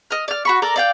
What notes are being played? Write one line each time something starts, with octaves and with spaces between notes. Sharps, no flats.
D#5 F6
D5 F6
F#4 B5 C#6
A4 A#4 D5 A#5
D5 F5 G5